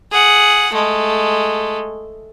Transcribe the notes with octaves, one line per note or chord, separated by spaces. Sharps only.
G#4 F#5
G#3 A3